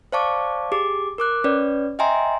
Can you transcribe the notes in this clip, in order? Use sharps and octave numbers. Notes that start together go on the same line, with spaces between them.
C5 D5 F5 A5 C#6 D6
G4 G#4 D6
A#4 D6 F#6
C#4 B4 C#5 D5
D#5 E5 G5 G#5 A#5 C6